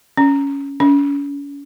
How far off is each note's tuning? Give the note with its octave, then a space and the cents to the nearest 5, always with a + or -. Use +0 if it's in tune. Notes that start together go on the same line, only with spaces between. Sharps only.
C#4 +10
C#4 +35